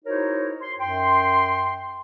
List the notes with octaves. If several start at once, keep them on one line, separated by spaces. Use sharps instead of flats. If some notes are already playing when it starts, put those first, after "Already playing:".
D#4 E4 F#4 A#4 C5 C#5
C6
F#2 G5 C6